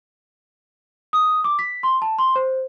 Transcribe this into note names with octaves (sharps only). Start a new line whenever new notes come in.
D#6
D6
B6
C6
A5
C6
C5